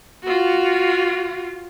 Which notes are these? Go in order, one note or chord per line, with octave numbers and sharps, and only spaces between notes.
F4 F#4